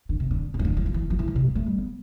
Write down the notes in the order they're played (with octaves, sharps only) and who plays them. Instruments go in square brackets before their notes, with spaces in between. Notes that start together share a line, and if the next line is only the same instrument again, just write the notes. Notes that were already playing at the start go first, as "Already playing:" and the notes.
[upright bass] D3
C3
D3
C3
E3
D3
E3
F3
E3
F3
E3
D3
C3
G3
A3
G3
B3